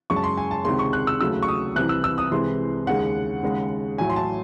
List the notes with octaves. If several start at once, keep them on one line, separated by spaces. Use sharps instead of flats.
F#2 C#3 G#3 C#6
A5
C6
G#5
A5
C#2 C3 D#3 G#3 C6
C#6
F#6
E6
D#2 C#3 F#3 A3 E6
C#6
D#6
C2 C3 E3 F#6
E6
E6
D#6
C2 C3 E3 G#3 C6
D#2 C#3 G#3 F#5
D#2 C#3 G#3
A1 A2 F#3 G#5
C6
A5